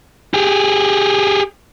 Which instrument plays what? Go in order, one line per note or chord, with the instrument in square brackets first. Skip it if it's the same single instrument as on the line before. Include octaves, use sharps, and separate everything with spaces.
[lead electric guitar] G4 G#4